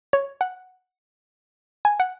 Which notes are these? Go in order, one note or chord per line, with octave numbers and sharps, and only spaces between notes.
C#5
F#5
G#5
F#5